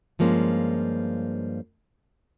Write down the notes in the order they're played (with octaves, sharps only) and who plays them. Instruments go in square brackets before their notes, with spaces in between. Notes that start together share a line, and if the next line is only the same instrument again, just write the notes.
[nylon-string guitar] G2 F3 G#3 A#3 C#4